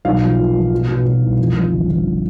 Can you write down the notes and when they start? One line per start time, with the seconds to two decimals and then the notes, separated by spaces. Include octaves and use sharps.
0.05 B1 F5
0.22 F3
0.38 A#2
0.55 F3
0.72 B2
0.89 B2
1.05 B2
1.22 C2
1.39 F2
1.55 F2
1.72 G1
1.89 G1